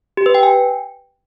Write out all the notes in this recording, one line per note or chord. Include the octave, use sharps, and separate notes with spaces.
G4
B4
G5
G#5